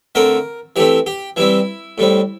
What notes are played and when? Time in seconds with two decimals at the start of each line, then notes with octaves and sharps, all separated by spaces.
0.15 D3 A3 C4 A#4
0.76 E3 A3 C4 G4
1.06 G4
1.36 E3 G3 C4 E4
1.98 A2 G3 C4